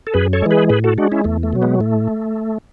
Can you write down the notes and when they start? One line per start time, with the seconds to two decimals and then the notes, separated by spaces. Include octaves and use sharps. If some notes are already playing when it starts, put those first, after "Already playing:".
0.07 A4
0.14 F#2 G#4 B4
0.33 A4 C#5
0.42 E3 G#3
0.51 G#4 B4
0.69 A2 G#4 B4
0.84 F#4 A4
0.98 G#3 D4 F#4
1.12 C#4 E4
1.24 E2 A3
1.43 A3
1.53 B2 F#3
1.62 G#3 B3
1.80 A2 A3